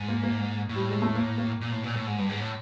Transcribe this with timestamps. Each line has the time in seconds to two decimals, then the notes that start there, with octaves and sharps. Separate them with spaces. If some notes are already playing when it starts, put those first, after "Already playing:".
Already playing: G#2
0.08 A#3
0.23 A#3
0.69 A2
0.76 G3
0.89 G#3
1.02 A3
1.15 A#3
1.38 A#3
1.61 A#2
1.72 A2
1.84 A#2
1.96 A2
2.07 G#2
2.18 G2
2.29 G#2
2.41 A2